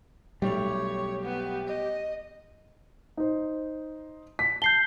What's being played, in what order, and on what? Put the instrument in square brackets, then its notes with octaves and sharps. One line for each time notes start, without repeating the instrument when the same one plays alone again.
[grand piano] B1 A3 F7 [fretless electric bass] G3 [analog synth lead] G4 [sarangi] C#5
[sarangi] B3
D#5
[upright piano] D#4 C5
B6
[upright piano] A5 [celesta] G6 C7 G7